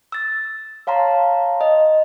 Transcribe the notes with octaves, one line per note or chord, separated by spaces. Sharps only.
E6 A6
C#5 F5 A5 A#5 C6
D#5